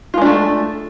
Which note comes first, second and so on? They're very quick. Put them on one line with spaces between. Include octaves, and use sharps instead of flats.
F4 G#3 D4 A3